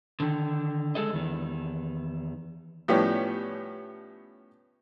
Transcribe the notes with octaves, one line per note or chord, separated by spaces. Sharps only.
D3 D#3
G#3 G#4 A4 D#5
E2 D#3
A2 F3 G3 B3 C#4 G4